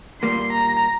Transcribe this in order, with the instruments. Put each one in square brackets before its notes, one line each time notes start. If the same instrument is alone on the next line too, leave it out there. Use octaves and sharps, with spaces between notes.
[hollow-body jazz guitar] A#2 G3 A#3 [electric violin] C6
[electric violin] A#5